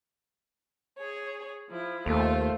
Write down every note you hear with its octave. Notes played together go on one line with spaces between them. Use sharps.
G#4 C#5
F3 E4
D#2 A3 F4 C5